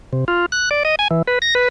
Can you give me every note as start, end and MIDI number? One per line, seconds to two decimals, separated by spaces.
0.13 0.25 48
0.28 0.46 65
0.52 0.69 90
0.71 0.83 74
0.85 0.95 75
0.99 1.08 80
1.11 1.22 52
1.27 1.39 71
1.42 1.54 94
1.55 1.68 71